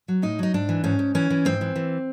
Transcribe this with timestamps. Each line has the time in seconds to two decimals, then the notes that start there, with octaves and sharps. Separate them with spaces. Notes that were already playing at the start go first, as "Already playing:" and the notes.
0.08 F#3
0.22 A2 D#4
0.39 F#3 D#4
0.54 G#2 D4
0.69 E3
0.84 G#2 C#4
0.99 G#2
1.15 E3 C#4
1.30 E3
1.45 G#2 C4
1.61 E3
1.76 E3